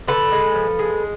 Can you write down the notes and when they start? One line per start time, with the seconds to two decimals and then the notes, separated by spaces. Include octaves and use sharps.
0.08 D3 A4 B4
0.32 G#3
0.55 F3
0.79 G#3